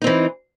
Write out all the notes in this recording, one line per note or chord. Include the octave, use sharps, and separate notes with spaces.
E3 C4 D#4